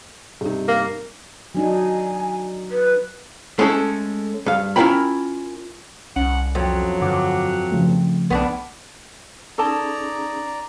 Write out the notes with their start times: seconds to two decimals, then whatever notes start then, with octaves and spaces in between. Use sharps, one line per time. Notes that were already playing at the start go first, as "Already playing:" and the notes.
0.41 G2 C3 D#4
0.68 A#3
1.55 F#3 D4 D#4 G#5
2.71 B4
3.59 G#3 A3 C#4 G4 A4
4.46 G2 F5
4.76 C#4 E4 F4 A#4 G5 B5
6.16 C2 C#4 F#5
6.55 F2 F#3
7.01 G2 D3 F#5 D6
7.72 C#3 F3 A3
8.30 B1 B3 C#4 D4
9.58 C#4 D#4 G#4 A4 D5 A5 A#5